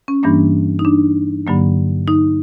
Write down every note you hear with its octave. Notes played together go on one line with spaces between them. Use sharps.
C#4
G2 E3 G3 A#3 D4
D#4
D4
G2 D3 F#3 A#3
D#4